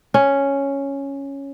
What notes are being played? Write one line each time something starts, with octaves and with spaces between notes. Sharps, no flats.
C#4